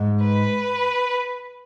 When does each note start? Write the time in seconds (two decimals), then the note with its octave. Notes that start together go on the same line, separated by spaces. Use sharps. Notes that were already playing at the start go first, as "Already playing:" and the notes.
Already playing: G#2
0.23 B4